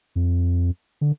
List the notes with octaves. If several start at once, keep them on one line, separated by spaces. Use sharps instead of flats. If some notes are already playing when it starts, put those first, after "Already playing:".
F2
D3